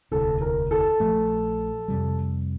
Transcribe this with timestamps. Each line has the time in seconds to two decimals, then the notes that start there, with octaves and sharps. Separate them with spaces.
0.11 E1 D2 C3 A4
0.41 A#4
0.71 A4
1.00 A#1 A#2 F3 A3
1.88 F2 C3 G3